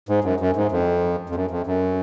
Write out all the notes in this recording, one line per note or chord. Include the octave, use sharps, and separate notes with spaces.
G#2
F#2
F#2
G#2
F2
F2
F#2
F2
F#2